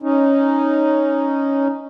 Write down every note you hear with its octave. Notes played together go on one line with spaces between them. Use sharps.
C#4 D#4